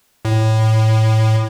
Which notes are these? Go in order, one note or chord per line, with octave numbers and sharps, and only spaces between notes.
A2